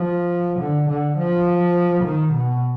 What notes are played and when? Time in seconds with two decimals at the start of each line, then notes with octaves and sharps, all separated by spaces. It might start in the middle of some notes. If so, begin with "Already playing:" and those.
Already playing: F3
0.60 D3
0.89 D3
1.18 F3
2.04 D#3
2.34 B2